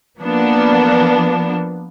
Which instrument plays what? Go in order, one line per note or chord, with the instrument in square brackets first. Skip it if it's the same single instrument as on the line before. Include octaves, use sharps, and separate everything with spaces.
[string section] F3 A#3 B3 D4